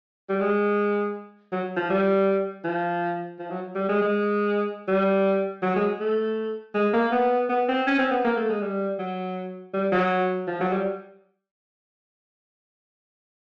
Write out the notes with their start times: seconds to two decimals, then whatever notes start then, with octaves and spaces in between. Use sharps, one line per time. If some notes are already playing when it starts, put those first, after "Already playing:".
0.29 G3
0.41 G#3
1.52 F#3
1.77 F3
1.90 G3
2.64 F3
3.39 F3
3.51 F#3
3.75 G3
3.89 G#3
4.02 G#3
4.88 G3
5.62 F#3
5.76 G#3
6.00 A3
6.74 G#3
6.93 A#3
7.12 B3
7.49 B3
7.68 C4
7.87 C#4
7.99 C4
8.11 B3
8.25 A#3
8.37 A3
8.49 G#3
8.61 G3
8.99 F#3
9.74 G3
9.92 F#3
10.48 F3
10.61 F#3
10.73 G3